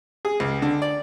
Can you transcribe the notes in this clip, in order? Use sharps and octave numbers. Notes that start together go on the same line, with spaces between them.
G#4
C#2
D3
D5